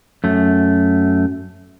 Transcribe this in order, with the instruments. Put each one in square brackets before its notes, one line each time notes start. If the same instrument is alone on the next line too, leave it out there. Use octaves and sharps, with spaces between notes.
[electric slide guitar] F#2 A3